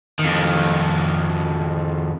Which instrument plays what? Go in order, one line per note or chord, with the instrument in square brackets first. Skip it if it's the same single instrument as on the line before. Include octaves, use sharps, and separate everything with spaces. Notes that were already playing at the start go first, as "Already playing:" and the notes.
[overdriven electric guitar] F2 D#3